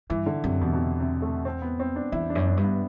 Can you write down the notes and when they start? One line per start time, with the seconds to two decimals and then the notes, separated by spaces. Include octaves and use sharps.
0.10 G2 E3
0.26 D3
0.44 F#2 C3
0.61 E2 B2
0.73 B2
0.77 C3
1.00 C3
1.22 A3
1.45 C4
1.62 B3
1.80 C4
1.96 D4
2.12 E2 E4
2.30 D4
2.35 F#2
2.47 D4
2.57 G2
2.63 B3